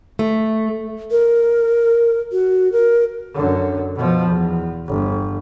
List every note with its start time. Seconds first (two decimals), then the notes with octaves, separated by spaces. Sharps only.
0.19 A3
1.11 A#4
2.32 F#4
2.72 A#4
3.34 F#2 D3
3.96 B2 F3
4.28 E2
4.88 G1